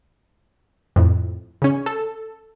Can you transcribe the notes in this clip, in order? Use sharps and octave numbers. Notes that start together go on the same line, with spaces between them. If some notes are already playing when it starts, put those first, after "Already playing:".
F2 A2
C#3 C#4
A4